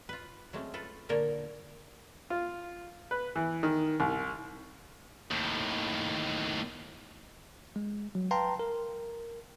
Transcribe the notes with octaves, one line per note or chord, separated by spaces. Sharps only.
F4 B4
F#3 G#3 A3 C4 C#4
F4 A4 B4
A#2 D3 A#3 A4 A#4 C#5
F4
B4
E3
D#3
C2
D#2 A2
G#3
F#3
B4 F5 G5 A5 A#5 C6
A#4